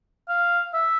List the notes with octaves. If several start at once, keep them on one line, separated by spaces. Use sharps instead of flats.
F5
E5